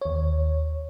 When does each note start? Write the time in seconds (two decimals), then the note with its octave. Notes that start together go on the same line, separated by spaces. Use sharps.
0.01 D#2 C#5